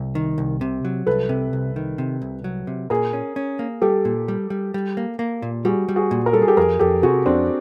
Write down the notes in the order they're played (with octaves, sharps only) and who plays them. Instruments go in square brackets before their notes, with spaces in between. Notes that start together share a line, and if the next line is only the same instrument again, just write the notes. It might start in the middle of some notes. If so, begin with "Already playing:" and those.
Already playing: [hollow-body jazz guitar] C2
D#3
C2
C3
F#3
[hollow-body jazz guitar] C2 [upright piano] A4 B4
[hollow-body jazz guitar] C3
C2
D#3
C3
C2
F#3
C3
[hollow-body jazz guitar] A#2 [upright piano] G#4 A#4
[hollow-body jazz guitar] C#4
C#4
A#3
[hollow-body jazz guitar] G3 [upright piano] G4 A4
[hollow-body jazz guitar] A#2
G3
G3
G3
A#3
A#3
A#2
[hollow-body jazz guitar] G3 [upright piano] F#4 G#4
[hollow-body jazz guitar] G3
[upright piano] F#4 G#4
[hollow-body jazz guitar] A#2
[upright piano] A#4
[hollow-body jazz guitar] G3 [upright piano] A4
[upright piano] G#4
G4 A4
[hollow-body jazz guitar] F2 [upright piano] G#4 A#4
[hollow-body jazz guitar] F2 [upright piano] G4 A4
[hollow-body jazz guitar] C3 [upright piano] F#4 G#4
[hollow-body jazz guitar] F2 [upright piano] C4 D4